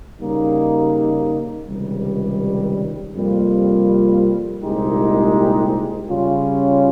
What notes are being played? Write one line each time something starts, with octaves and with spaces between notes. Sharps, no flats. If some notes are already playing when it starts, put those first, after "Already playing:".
C#3 G3 A#3 D#4
C#2 C3 D#3 G3
F2 C3 G3 A#3 F4
C2 A#2 G#3 D#4 G4
C#3 G3 C#4 F4